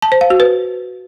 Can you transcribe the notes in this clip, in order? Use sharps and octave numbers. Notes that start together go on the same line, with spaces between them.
A5
C5
F5
F#4
B4